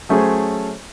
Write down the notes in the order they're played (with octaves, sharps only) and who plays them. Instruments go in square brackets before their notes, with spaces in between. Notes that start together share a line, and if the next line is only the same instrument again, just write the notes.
[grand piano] F#3 A3 C#4 G#4 C5 C#5